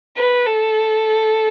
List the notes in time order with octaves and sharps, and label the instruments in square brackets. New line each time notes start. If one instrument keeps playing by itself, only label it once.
[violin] B4
A4